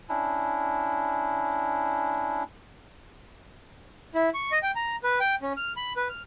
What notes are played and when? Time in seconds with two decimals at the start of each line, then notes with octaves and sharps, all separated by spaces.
0.09 C#4 D4 E4
4.15 E4
4.34 C#6
4.52 D#5
4.63 G5
4.76 A#5
5.04 B4
5.20 G5
5.42 C#4
5.57 F6
5.77 B5
5.96 B4
6.09 F6